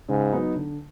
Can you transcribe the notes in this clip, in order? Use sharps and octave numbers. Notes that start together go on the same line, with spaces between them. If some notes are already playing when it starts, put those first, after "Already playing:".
G#2 C#3
F#3 B3 D#4
D3